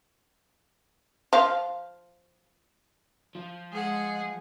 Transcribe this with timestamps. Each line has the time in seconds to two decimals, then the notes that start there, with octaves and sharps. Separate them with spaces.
1.33 F3 F5
3.35 F3
3.72 G#3 G#4 F#5